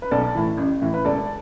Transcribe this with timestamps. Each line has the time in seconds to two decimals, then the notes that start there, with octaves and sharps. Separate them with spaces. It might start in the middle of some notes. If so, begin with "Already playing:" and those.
0.02 B4
0.11 B1 A4 D5
0.35 A2 E3
0.58 A1
0.82 A2 E3
0.94 B4
1.05 E1 A4 D5